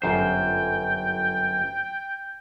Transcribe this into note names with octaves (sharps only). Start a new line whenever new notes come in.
G1 F#2 C5 G5